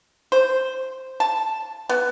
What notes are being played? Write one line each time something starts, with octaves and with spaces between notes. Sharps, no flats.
C5
A5
B3